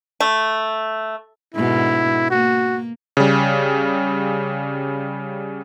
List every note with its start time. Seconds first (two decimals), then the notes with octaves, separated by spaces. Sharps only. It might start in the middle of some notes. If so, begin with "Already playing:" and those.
0.20 A3
1.55 G#2 B2 D3 E4
2.31 A#3 F#4
3.17 C#3 G3